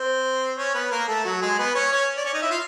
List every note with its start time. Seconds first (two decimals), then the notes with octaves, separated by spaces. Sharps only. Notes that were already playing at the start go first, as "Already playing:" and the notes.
Already playing: C4 C5
0.58 C#4 C#5
0.74 B3 B4
0.91 A#3 A#4
1.08 A3 A4
1.25 F#3 F#4
1.41 G#3 G#4
1.58 B3 B4
1.75 C#4 C#5
1.92 C#4 C#5
2.17 D5
2.25 C#4 C#5
2.33 D#4 D#5
2.42 E4 E5
2.50 F4 F5